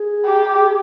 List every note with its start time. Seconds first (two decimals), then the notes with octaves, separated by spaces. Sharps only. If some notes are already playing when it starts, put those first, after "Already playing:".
Already playing: G#4
0.25 G4